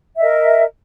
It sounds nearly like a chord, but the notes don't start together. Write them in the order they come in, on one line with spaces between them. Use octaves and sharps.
E5 D#5 A#4